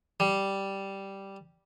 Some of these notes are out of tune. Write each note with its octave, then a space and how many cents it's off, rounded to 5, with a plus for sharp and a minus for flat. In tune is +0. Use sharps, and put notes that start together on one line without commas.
G3 -5